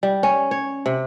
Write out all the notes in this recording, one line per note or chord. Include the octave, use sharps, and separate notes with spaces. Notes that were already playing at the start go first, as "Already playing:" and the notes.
G3
C#4
C#5
C3